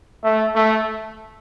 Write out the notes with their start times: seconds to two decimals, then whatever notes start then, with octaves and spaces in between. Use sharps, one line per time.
0.24 A3 E5
0.55 A3 E5